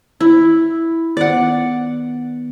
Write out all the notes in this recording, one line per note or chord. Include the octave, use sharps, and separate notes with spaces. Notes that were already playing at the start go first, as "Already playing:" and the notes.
E4
D#3 B3 D5 F#5